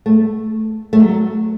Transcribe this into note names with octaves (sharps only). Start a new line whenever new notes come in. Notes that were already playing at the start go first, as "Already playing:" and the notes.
A3
A3
F#3